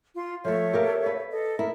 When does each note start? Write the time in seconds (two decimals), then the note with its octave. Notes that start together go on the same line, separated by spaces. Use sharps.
0.16 F4 C6
0.45 F3 A3 A4 C#5 E5
0.73 G4 A#4 F5
1.06 B4
1.31 A4 D#5
1.59 E4 A#4